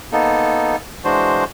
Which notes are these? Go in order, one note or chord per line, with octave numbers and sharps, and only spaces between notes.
A#3 B3 D#4 A4
E3 G#3 D4 F#4 C5